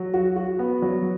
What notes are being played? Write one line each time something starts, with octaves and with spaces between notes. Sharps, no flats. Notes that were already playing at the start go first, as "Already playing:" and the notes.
Already playing: F#3
F#4
F#4
B3
F#3